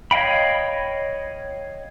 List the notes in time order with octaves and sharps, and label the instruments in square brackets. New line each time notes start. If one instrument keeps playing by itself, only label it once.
[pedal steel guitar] C#5 D#5 F5 G5 B5